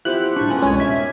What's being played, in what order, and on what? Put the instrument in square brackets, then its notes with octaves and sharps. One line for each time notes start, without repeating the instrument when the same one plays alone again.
[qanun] F3 C4 B4 [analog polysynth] E4 G4 F#5 [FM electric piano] F#6
[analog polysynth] A2 G3 C#6 [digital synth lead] D4 [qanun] A4
[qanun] G#3 B3 D#4 [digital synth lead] C#4
[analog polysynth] C2 F2 B2 [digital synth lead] G#3 [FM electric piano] C#4 G#5 [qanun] A#4
[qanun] G4 A#4 [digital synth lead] E5 [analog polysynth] G#6